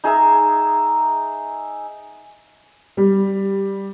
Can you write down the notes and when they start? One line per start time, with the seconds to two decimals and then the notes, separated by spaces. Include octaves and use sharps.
0.04 D#4 G#4 E5 A#5
2.97 G3